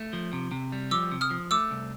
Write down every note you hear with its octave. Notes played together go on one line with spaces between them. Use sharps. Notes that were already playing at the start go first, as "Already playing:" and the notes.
Already playing: A3
F3
C3
C3
G3
F3 D6 E6
C3
D#6 F6
F3
A3 D6 E6
C2